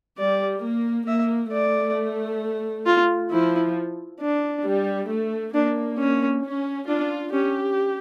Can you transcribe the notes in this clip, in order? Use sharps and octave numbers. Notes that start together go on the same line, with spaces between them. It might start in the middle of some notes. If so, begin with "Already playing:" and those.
G3 D5
A#3
A#3 E5
A3 D5
F4
F3 E4
D4
G3
A3
A#3 D4
C#4
C#4
D4 F4
C#4 G4